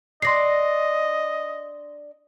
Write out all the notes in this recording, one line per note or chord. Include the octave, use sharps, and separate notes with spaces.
D4 D5 D#5 C6 A#6 C7